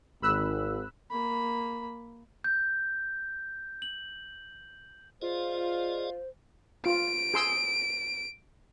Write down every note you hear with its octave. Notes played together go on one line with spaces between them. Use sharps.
G#1 B5 E6 F#6
A#3 B5
G6
F#7
F4 G#4 C5 D5 D#5
F4 D7
G#4 C6 E6